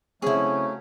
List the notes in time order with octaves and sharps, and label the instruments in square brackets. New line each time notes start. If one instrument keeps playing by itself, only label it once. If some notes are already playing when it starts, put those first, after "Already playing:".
[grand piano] C#3 C4 [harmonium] F#3 A3 [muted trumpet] C#4 [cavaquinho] E4 G#4